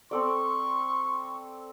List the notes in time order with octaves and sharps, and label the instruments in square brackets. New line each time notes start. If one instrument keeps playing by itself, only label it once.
[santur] C4 A4 D5 [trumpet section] C6 C#6